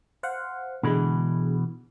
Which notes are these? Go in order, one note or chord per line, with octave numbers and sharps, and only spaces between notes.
C5 F5 F#5
B2 D3 E3 G#3 B5